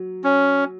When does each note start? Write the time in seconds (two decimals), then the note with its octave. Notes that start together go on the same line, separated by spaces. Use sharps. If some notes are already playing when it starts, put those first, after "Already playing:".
Already playing: F#3
0.24 C#4